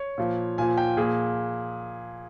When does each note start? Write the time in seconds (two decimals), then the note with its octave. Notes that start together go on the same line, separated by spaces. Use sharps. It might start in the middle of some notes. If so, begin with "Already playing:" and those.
Already playing: C#5
0.18 A#2 F3
0.58 A#2 F3 G#5
0.77 G5
0.97 A#2 F3 G#4